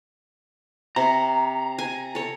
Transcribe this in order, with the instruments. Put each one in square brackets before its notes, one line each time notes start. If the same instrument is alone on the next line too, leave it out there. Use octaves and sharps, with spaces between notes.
[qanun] C3 [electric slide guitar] A#5
[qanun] G#5
A4 C#5